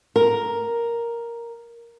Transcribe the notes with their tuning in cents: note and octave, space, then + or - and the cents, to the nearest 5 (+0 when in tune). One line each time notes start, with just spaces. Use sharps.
A#4 +5